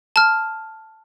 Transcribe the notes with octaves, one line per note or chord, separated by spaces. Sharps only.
A5 F6